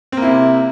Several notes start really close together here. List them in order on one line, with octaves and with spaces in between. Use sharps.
C4 A#3 E4 C3